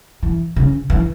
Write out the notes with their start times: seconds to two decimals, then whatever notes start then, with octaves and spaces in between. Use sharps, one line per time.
0.23 E3
0.56 C#3
0.90 E3